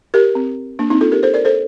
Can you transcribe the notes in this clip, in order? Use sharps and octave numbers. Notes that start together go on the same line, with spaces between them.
G4 A#4
C4
A#3 D4
C4 D#4
F4 A4
G4 A#4
A4 C5
A#4 D5
A4 C5